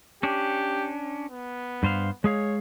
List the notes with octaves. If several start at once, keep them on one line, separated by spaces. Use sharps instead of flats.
C#4 D4 G4
B3
G2 C5 F5
G#3 G#4 C#5 F5